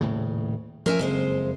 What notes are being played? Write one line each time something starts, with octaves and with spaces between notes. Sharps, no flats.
D#1 A2 C#3
F3 C#4 A#4 E5 G#5
F#1 F2 G#3 C5